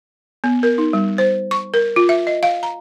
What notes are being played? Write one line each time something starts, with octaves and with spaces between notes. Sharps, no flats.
B3
A#4
D#4
G3
C5
C#6
A#4
F4
E5
D#5
F5
A#5